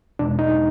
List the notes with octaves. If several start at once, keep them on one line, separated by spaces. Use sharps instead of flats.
E2 B2 G#3 D4
D#4